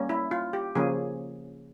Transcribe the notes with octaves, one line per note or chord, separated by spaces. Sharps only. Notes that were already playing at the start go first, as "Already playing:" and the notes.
Already playing: G3 A#3 C#4
E4
F4
G4
C#3 F3 A#3 C#4 G#4